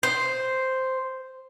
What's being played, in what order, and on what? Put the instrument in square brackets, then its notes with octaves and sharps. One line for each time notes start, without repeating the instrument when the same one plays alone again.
[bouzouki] C5